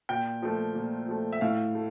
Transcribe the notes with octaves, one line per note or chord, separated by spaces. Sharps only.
A#2 G5
F3 A3
A#2
F3 A3
E5
A2 F5
A3